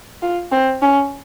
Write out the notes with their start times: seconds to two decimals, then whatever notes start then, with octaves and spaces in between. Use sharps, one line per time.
0.22 F4
0.52 C4
0.82 C#4